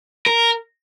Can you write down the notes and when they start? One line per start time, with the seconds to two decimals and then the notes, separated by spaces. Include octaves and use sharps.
0.26 A#4